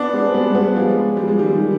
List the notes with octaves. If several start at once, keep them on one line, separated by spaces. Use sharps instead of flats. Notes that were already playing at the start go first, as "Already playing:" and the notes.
Already playing: B3 D4
G#3 C4
G3 B3
G#3
G3 B3
F3 G#3
G3
G#3
D#3 G3
D#3